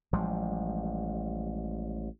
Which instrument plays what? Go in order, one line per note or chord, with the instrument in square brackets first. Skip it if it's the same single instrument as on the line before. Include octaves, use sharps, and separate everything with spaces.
[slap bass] A1 F3 G3 G#3